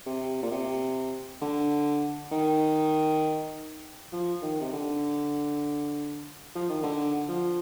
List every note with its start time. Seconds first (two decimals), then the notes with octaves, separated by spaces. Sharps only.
0.06 C3
0.43 A#2
0.51 C3
1.41 D3
2.32 D#3
4.13 F3
4.42 D#3
4.61 C3
4.73 D3
6.55 F3
6.69 D#3
6.83 D3
7.29 F3